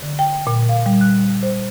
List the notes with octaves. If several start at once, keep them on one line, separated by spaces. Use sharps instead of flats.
D3
G5
A#2
F5
G3
F#6
C5